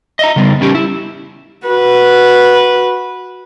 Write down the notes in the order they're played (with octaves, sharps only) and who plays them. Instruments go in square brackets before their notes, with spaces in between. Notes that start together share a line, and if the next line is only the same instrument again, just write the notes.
[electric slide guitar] D#5 E5 A#5
C#3 G3 B3
G3 C#4 G4
E4
[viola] F#4 B4